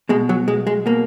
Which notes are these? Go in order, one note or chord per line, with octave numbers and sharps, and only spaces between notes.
B2 G#3
F#3
B1 G#3
G#3
B2 A#3